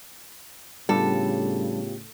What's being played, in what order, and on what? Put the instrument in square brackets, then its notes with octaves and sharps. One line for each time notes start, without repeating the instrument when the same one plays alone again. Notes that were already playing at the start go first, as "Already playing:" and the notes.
[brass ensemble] A2 C#3 [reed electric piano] G3 D4 [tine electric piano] B3 F4 G4 [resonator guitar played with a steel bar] A4